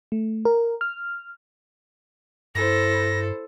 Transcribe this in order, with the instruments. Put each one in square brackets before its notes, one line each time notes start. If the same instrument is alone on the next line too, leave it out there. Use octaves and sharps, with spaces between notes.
[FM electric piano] A3
A#4
F6
[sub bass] G2 [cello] E4 C5 [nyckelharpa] A4 [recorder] A#6